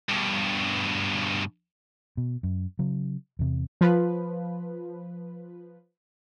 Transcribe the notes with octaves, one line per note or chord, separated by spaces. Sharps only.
G2 B2
B2
F#2
C#3 F#3
E2 C3
F3 B4